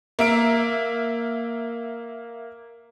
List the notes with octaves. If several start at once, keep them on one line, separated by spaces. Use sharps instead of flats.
A#3 E5 D7